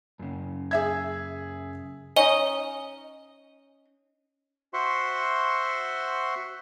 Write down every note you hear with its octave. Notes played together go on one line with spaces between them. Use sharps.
F#2 C#3
G#4 E5 G#6
C#4 D#4 D#5
F#4 C5 E5 F#5 C6 C#6